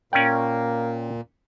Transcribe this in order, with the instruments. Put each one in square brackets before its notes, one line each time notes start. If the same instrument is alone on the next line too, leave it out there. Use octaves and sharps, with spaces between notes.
[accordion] A#2 [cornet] A#3 [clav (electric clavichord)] C#4 A#4 D5 [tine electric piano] G5